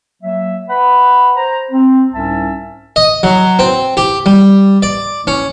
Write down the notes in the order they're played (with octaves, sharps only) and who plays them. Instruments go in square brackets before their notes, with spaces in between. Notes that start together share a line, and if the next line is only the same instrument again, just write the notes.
[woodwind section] F#3 A#3 E5
B4 F#5 B5
C5 A#5
C4
C2 G#2 C#4 E5 A5
[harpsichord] D#5
F#3
C4
G4
G3
D5
C#4